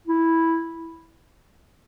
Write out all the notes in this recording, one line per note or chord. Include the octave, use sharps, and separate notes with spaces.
E4